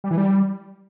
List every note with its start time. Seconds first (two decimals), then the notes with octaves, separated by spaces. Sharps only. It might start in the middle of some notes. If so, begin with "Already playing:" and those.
0.04 G3
0.11 E3
0.18 G3